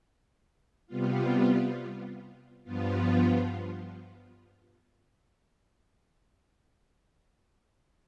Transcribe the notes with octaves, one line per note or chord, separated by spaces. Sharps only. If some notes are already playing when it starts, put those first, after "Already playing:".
C3 G3 B3 F4
G2 F3 B3 F4